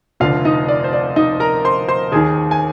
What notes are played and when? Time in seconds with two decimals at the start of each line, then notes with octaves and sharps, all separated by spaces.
0.20 F1 F2 D3 F4 F5
0.45 D#4 D#5
0.68 D5
0.84 C5
0.93 D5
1.16 D#4 D#5
1.40 A#4 A#5
1.65 C5 C6
1.88 C5 C6
2.12 D#2 D#3 G#4 G#5
2.51 G#5